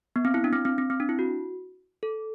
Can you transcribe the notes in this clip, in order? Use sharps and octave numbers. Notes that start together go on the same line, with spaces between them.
B3
C4
E4
D4
C4
C4
C4
C4
D4
E4
F#4
A4